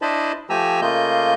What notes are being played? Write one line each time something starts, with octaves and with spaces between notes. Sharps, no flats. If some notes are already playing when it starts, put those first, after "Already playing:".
D4 E4 C5 D#5 A5 B5
F3 A3 G4 G#5 A#5 E6
C#3 A3 A#3 F4 D#5 G6